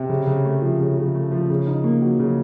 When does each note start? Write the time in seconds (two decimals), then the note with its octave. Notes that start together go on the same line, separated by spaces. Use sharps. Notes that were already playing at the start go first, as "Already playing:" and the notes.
Already playing: C3
0.09 C#3
0.27 C#3
0.45 A3
0.62 F3
0.80 C#3
0.98 C#3
1.15 A3
1.32 F3
1.50 C#3
1.67 D#4
1.84 A#3
2.02 F#3
2.19 C#3